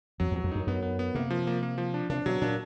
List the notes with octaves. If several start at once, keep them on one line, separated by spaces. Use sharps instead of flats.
F2 F#3
E2 F#3
F2
F#2 D#4
F#2 B3
B3
B3
C3 A#3
F3
A#3
A#3
F3
D4
C3 D4
B2 F#3
A#2 D4